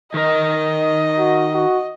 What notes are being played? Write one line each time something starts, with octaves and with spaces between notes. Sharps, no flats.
D#3 A#4 D#5
F#4
F#4